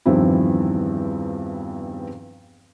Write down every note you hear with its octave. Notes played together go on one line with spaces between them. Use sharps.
E2 G2 D#3 F3 C4 E4